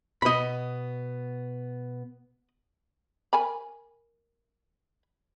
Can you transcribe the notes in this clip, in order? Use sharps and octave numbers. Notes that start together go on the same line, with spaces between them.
B2 B3 D#5 B5
A#4 G#5 B5